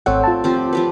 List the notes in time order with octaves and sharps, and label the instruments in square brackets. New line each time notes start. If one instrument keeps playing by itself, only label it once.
[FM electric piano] G#1 C#5 F#5 [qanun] A3 C4
[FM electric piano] F4 A5
[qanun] F3 C4 G4
F3 G4 B4